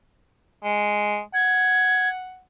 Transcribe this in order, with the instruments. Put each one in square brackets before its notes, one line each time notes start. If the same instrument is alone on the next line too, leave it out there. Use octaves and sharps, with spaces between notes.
[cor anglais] G#3
[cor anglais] F#5 [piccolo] G#6